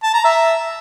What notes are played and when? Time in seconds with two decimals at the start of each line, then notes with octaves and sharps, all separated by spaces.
0.03 A5
0.14 A#5
0.25 E5